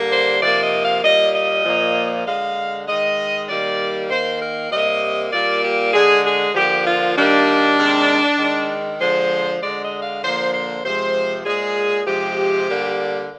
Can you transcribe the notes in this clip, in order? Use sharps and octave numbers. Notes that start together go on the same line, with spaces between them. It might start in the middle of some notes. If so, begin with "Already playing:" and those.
Already playing: D3 G3 A#3
C5
C3 F3 A#3 D5
D#5
F5
A#2 G3 A#3 D#5
D#5
A#2 F3 A#3
D3 G#3 F5
D#3 G#3 D#5
D#3 G3 A#3 D5
D#3 A#3 C5
A#4
C3 G3 A#3 D#5
A#2 G3 A#3 D5
G4
D3 G#3 G#4
G#4
D3 F3 A#3 G4
F4
D#3 G3 A#3 D4
C3 D#3 G#3
D#3 G#3
D3 F3 G#3 C5
D3 G#3 D5
D#5
F5
D3 F3 A#3 C5
C5
C3 F3 G#3 C5
A#2 G#3 G#4
C3 F3 G#3 G4
D3 G3 A#3